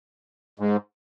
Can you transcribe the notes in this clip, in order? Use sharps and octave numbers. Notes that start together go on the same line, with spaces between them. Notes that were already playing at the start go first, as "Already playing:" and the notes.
G#2